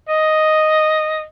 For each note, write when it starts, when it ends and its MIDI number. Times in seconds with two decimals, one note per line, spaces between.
0.09 1.23 75